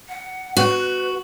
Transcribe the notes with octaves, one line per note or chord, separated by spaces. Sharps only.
F#5
F#4 B4